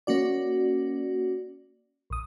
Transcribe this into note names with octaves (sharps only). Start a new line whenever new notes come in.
A#3 C#4 F#4 D5
A#1 D#6